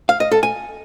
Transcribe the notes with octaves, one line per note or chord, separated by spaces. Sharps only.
F5
D#5
A4
G#5